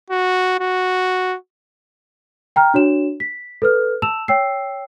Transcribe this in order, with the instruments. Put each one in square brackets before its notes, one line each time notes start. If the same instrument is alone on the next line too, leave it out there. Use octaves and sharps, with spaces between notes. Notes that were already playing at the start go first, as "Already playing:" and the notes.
[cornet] F#4
F#4
[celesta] G5 A#5 F6
D4 F#4 C#5 E7
B6
A4 B4 F6
A5 E6 E7 F7
C#5 G5 E6 C7